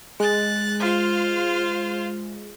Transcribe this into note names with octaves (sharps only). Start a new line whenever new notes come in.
G#3 F#6 A6
F4 C5 F5